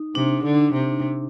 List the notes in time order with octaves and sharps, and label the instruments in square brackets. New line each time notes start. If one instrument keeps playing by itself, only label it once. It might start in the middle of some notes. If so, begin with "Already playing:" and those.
Already playing: [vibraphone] D#4
[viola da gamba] C3 [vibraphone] D4
[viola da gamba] D3
C3